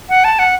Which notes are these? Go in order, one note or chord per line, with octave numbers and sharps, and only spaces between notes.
F#5
A5
F#5